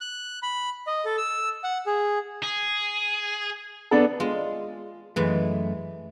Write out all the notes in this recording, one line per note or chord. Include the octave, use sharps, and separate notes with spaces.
F#6
B5
D#5
A4
E6
F#5
G#4
G#4
B3 D4 A4
G#3 F4
F#2 E3 G#3 A3